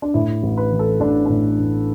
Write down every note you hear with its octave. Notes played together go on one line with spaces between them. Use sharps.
D4
A2 E4
A1
B4
E3
A4
A1 D4
D4
A2
A1